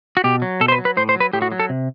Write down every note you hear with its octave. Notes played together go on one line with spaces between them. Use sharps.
F#4
B2 G4
F#3
B2 A4
C5
B4
F#3
B4
A2 C5
C5
F#3
B4
A2 G4
F#4
F#3
A4
C3